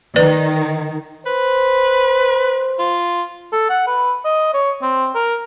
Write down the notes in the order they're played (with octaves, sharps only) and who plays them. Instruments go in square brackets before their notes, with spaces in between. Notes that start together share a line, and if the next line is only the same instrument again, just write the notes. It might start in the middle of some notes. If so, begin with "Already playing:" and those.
[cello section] D#3 [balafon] B4 D5
[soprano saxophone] B4 [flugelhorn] C5
[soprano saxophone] F4
[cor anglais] A4
F#5
B4
D#5
C#5
C4
A#4